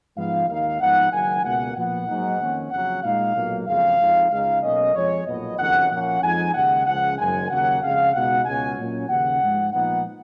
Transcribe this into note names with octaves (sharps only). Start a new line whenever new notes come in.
G#2 F3 B3 D#4 F5
D#2 D#3 A#3 D#4 F5
G#2 F3 B3 D#4 F#5
F#1 F#2 D#3 G#5
C#2 B2 A#3 F#5
A#2 F3 B3 F#5
G#2 F#3 A#3 D#4
F2 D#3 A#3 C#4
F2 C#3 F#3 F#5
A#2 G#3 D#4 F5
B1 A#2 F#3 A#3
F#1 F2 C#3 G#3 F5
F2 F3 G#3 D#4
C#2 C#3 G#3 D#4 F5
B1 B2 A#3 C#4 D#5
F2 F3 G#3 C#5
B1 A#2 F3 B3 D#5
F#1 F2 D#3 F#3 C#4 F#5
A#2 F3 A#3 C#4 F#5
F2 F3 G#3 D#4 G#5
D#2 C#3 G#3 F#5
C#2 C#3 F3 F#5
F#1 F#2 D#3 G#3 G#5
D#2 C#3 F#3 A#3 F#5
F2 C#3 G#3 F5
C#2 B2 G#3 D#4 F#5
C#2 B2 G#3 C#4 G#5
A#2 F#3 C#4
D#2 C#3 F3 F#5
G#2 F3 G#3
A#2 F3 B3 D#4 F#5